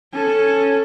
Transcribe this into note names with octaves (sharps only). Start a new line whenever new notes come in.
C#4 A4